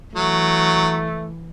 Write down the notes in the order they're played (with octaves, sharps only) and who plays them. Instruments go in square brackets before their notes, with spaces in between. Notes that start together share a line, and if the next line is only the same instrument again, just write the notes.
[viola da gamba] E3 [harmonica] F#3 [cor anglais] A3